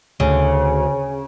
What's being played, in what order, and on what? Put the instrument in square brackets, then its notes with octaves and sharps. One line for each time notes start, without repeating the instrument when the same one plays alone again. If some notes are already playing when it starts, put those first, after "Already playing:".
[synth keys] D2 [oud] C#3